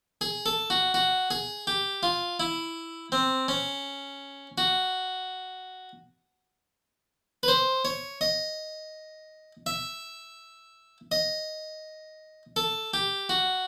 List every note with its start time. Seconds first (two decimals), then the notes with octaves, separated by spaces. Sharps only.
0.21 G#4
0.46 A4
0.70 F#4
0.94 F#4
1.31 G#4
1.67 G4
2.03 F4
2.40 E4
3.12 C4
3.48 C#4
4.58 F#4
7.43 B4
7.48 C5
7.85 C#5
8.21 D#5
9.66 E5
11.12 D#5
12.56 A4
12.94 G4
13.29 F#4